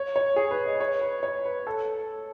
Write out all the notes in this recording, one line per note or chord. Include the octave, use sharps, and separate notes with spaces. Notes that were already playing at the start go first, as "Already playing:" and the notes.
Already playing: C#5
C#5
G#4
B4
D#5
C#5
B4
C#5
B4
A4